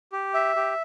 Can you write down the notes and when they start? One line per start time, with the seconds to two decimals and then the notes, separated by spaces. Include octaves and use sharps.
0.12 G4
0.34 E5
0.56 G4